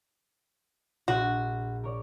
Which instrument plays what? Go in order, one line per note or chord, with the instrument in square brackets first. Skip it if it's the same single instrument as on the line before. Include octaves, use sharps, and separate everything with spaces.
[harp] A#1 [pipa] F#4
[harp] A#4 C#5 D5